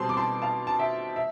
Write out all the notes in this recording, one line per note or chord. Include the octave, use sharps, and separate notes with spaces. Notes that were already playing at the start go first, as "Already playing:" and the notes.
Already playing: B2 G3 C4 A5 C6
D6
A5 C6
F5 A5
A5
E5 G5
E5